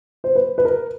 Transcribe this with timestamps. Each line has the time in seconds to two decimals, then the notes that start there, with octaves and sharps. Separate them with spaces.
0.24 C5
0.35 B4
0.58 B4
0.65 A#4